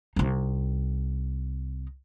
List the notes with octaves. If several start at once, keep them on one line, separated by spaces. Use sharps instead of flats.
C2 D#4